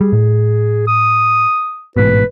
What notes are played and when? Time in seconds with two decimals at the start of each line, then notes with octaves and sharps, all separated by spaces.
0.01 G3 G#4
0.13 A2
0.87 D#6
1.97 A1 G#2 B2 B4